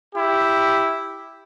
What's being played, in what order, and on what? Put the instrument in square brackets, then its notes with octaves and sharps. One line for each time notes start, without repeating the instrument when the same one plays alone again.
[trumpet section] E4 G4